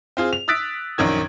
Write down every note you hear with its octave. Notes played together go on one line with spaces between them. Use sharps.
C4 F4 G#4
F7
D#6 E6 F#6 A6 B6 D7
A#1 F#2 D#3 G#6